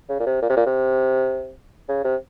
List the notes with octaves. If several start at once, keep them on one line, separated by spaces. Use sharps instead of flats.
C#3
A#2
C3
A#2
C3
A#2
C3
C#3
C3